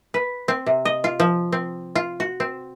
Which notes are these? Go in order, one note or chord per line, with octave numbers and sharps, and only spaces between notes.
B4
C4
C3
D#5
F4
F3
C4
F4
F#4
C4